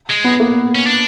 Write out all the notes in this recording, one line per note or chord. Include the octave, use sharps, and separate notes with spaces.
G#3
B3
A#3
C#4
D4